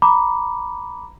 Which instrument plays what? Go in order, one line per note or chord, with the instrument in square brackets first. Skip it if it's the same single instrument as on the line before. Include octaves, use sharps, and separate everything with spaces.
[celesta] A#5 B5 D6